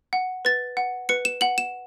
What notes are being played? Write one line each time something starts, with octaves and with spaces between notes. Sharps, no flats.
F#5
B4 A6
F#5
B4 C#7
E7
F#5 F#7
E7